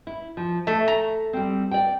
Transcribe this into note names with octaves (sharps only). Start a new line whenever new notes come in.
E4
F3
A3 E5
A#5
G3 C4
D5 G5